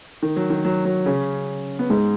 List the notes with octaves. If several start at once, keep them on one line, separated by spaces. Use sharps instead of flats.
D#3
F#3
D#3
F#3
F#3
C#3 C#4
B3
G#2 G#3